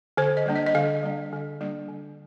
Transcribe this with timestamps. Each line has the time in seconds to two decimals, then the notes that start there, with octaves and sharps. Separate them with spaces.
0.17 D3 C5
0.37 D#5
0.46 G3 A#3 D4
0.56 D#5
0.67 D#5
0.75 D3 F5
1.03 G3 A#3 D4
1.32 D3
1.61 G3 A#3 D4
1.89 D3